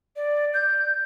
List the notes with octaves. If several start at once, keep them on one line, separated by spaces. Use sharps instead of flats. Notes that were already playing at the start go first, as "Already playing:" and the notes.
D5
G6